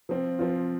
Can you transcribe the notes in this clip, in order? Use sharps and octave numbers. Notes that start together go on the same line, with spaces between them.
F3 C4 F4
F3 C4 F4